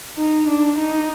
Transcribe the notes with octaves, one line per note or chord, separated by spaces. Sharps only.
D#4
D4
D#4